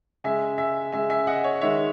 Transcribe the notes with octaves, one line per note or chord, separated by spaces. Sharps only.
C#3 G#3 E5 G#5
E5 G#5
C#3 G#3 E5 G#5
E5 G#5
D#5 F#5
C#5
D#3 G#3 C#5 E5